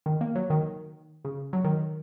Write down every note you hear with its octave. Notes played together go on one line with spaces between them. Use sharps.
D#3
A#3
F#3
D#3
C#3
F#3
D#3